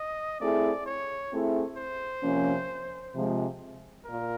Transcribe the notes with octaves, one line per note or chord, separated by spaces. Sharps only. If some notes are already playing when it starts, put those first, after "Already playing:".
Already playing: D#5
A3 C4 E4 G#4 D5
C#5
A3 C4 E4 G#4
C5
C3 F3 A#3 C#4
C3 F3 G#3
A#2 A#4